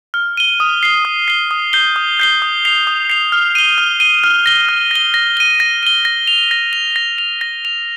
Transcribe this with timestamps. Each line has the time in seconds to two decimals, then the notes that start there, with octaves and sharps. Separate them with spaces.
0.14 F6
0.37 D#7 G7
0.60 D#6
0.83 C7 G7
1.05 D#6
1.28 C7 G7
1.51 D#6
1.73 G6 C7 G7
1.96 D#6
2.19 G6 C7 G7
2.42 D#6
2.65 C7 F7
2.87 D#6
3.10 C7 F7
3.32 F6
3.55 D#7 G7
3.78 F6
4.00 D#7 G7
4.24 F6
4.46 A#6 G7
4.69 F6
4.91 A#6 G7
5.14 A#6
5.37 D#7 G7
5.60 A#6
5.83 D#7 G7
6.05 A#6
6.27 F7
6.51 A#6
6.73 F7
6.96 A#6
7.18 F7
7.41 A#6
7.65 F7